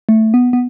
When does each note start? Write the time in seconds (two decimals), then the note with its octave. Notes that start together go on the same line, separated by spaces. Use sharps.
0.09 A3
0.34 B3
0.53 B3